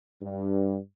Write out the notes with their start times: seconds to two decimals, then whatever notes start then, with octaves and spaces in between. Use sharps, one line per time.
0.22 G2